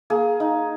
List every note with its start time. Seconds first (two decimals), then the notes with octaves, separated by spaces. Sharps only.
0.10 A#3 G#4
0.40 D#4